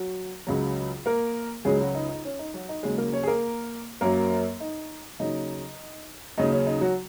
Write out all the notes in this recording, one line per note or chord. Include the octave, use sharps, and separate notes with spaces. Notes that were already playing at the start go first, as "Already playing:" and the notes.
Already playing: F#3 F#4
C#2 C#3 F#3 F#4
A#3 A#4
C#2 C#3 F#3 G#3 G#4
F#3 F#4
D#4
D#4
C#4
D#4
F#3 F#4
D#4
D#2 C#3 F#3 G#3 G#4
A#3 A#4
C#4 C#5
G#4
A#3 A#4
F#2 F#3 A#3 A#4
D#4
D#2 C#3 F#3 D#4
D#2 C#3 F#3 D#4
C#4
D#4
F#3 F#4